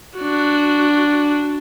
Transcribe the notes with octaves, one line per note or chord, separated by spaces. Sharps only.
D4 F#4